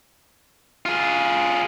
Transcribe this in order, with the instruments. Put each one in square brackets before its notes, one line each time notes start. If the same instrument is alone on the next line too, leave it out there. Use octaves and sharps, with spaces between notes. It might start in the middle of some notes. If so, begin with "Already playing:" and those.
[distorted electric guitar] F4 G#4